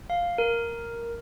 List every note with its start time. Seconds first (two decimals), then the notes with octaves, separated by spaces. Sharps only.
0.10 F5
0.38 A#4